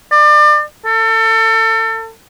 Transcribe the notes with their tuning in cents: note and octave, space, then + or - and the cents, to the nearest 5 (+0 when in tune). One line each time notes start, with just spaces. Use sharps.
D5 +30
A4 +30